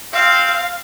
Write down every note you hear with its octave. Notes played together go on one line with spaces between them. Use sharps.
C4 F5